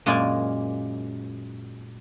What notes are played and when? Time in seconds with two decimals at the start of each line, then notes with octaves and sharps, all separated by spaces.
0.06 F#2 A#2 G#3 A#3 D5 G#5